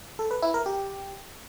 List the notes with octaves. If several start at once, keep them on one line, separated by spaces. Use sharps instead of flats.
A4
B4
E4
A#4
G4